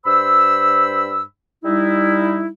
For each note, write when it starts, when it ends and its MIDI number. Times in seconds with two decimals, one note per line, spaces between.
0.05 1.22 43
0.05 1.22 72
0.05 1.22 83
0.05 1.22 88
1.63 2.48 55
1.63 2.48 63
1.63 2.48 64